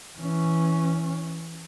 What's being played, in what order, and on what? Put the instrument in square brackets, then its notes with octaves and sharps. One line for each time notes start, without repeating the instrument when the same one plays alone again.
[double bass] E3 C#4